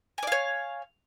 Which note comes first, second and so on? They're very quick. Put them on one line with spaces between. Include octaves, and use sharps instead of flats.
G#5 D5 F5 C#5